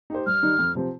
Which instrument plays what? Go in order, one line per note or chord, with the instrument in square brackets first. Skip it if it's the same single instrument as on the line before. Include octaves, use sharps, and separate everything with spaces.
[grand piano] D#4 G4 C5
[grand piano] G2 [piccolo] F6
[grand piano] D#3 G3 D#4
F2
C3 F3 C4